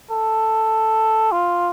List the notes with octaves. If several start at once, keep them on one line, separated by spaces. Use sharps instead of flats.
A4
F4